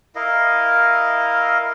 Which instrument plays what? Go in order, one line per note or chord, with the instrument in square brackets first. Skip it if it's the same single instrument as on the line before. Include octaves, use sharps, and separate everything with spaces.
[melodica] E4 A#4 D#5 F5